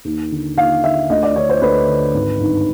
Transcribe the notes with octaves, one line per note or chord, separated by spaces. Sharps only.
D#2
D3
D#2 F5
D3 E5
D2 D#5
D5
D3 C#5
C5
D2 B4
D3
G#1
G2 D#3